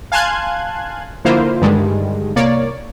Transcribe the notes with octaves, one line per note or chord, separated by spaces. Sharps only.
F5 G#5 A5 C6 F#6 G#6
D3 F3 A#3 E4 F4 C5
G2 D3 D#3 G3 G#3
C2 A#3 C#5 D5